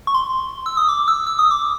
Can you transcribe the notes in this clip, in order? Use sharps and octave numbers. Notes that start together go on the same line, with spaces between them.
C#6
C6
E6
D#6
D6
E6
E6
D#6
D6